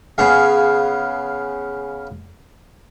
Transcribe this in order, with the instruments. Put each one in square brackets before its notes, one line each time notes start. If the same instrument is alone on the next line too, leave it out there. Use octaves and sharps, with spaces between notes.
[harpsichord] C#3 B3 G#4 F5